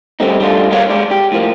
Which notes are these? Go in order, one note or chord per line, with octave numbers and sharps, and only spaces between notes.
D#3 G3 A3 C4 C#4 D#4
G3 A3 D4 F4
G2 G3 A#3 D#4 C#5 F5
G#2 G#3 D5
G4
A2 F3 A#3